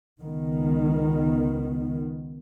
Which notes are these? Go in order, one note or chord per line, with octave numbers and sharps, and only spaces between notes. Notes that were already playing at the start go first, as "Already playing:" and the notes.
C#2 D#3 B3